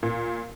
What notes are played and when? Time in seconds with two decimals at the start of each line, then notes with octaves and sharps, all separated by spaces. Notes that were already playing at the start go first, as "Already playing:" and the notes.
0.03 A#2